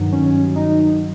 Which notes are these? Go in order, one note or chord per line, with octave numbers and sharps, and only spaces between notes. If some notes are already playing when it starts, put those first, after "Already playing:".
Already playing: G2 D#3 F#3
C#4
D#4